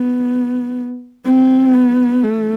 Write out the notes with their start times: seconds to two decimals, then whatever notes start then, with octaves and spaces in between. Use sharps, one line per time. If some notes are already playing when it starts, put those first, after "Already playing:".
Already playing: B3
1.26 C4
1.73 B3
2.23 A3